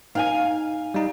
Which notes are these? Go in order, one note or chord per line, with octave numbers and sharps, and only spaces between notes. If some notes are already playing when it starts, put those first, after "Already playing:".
D#4 F5 G5 G#5
G3 D#4